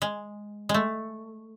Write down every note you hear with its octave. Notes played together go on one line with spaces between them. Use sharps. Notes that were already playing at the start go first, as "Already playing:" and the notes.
G#3
G#3
A3